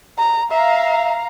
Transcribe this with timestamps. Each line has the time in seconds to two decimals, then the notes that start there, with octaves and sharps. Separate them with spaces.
0.18 A#5
0.51 E5 F5 A#5